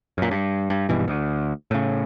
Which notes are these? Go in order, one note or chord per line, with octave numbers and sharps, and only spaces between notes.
F#2 A#2
G2
G2
G#1 G2 B2 E3
D2
A2 C#3